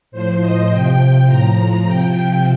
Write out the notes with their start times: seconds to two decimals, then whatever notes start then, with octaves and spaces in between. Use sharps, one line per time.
0.11 A2 F3 C5
0.40 D#5
0.69 C3 F3 G5
1.27 A2 F3 A#5
1.85 C3 F3 G5